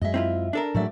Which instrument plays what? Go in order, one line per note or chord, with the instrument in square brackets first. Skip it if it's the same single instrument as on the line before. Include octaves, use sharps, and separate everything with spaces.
[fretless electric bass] F#2 G#3 [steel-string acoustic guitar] D#5 E5
[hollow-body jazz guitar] C4 E4 F4
D4 A4 A#4
[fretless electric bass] A2 F#3 G#3 [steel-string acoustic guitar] A3 D5 E5